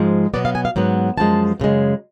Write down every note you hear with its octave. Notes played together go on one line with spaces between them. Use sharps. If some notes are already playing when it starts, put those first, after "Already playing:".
Already playing: G#2 F3 G#3
B2 F#3 B3 D5
F5
G#5
F5
G#2 F#3 B3
F#2 F3 G#3 A5
F#2 C#3 G#3